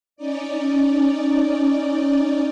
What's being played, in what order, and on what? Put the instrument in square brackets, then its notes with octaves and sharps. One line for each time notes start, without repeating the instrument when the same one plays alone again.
[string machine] C#4 D#4 D5